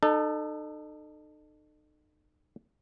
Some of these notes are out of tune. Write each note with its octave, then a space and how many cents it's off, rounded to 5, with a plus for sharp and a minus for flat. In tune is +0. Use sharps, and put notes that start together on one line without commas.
D#4 -35 A4 +5